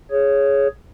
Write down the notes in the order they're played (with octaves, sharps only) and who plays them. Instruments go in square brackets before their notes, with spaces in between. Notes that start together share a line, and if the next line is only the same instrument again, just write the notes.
[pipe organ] G#4 C#5